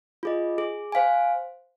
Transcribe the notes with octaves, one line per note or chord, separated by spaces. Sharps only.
F4 G#4 D#5
G#4
C5 F5 G#5